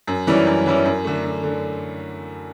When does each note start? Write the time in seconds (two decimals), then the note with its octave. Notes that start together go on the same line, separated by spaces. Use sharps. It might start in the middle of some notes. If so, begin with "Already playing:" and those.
0.07 F#2
0.27 E3 G3 C#4 E4
0.47 F#2
0.66 E3 G3 C#4 E4
0.85 F#2
1.04 D3 A3
1.24 F#2
1.44 D3